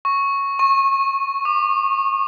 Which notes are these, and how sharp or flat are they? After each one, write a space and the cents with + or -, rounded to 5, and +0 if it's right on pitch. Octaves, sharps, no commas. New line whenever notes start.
C#6 -5
C#6 -25
D6 +35